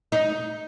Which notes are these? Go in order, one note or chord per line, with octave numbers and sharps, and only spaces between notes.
D#4